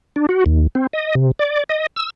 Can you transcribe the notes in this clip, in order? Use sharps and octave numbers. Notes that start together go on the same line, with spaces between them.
D4
F#4
D#2
C4
D#5
C3
D5
D#5
E6